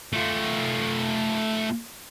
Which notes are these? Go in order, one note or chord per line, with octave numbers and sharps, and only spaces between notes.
A3 F4